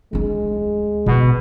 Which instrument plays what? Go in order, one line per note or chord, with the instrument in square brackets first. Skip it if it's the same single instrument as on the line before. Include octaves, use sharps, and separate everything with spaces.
[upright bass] D1 D4 [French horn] G#3
[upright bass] A1 [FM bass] B2